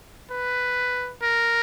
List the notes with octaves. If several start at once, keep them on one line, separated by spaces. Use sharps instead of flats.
B4
A#4